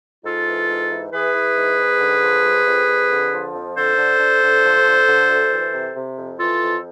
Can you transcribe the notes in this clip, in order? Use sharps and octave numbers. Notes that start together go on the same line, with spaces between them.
G#2 F4 A4
E3
G#2
E3
E3 G#4 B4
E3
G#2
G#2
D3
F3
F2
F2
F2
D3
F3
F2
D3 A4 C5
D3
D3
D3
F3
D3
D3
D2
E3
C3
C3
F2
E3 F4 A4
F2